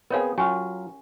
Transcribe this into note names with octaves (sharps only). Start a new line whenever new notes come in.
B3 C4 G#4 A#4 C#5 F5
F#3 C#4 F4 G4 G#5